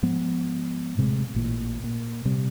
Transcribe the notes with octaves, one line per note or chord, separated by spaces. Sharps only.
G#2 F3 B3
D#1 A2 C3 G#3
A1 A#2 E3
A#2
C3 G3